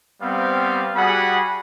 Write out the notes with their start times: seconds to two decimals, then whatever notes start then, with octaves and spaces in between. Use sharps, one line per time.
0.21 G3 B3 C4 C5 F5
0.95 G3 F#4 G#4 F#5 B5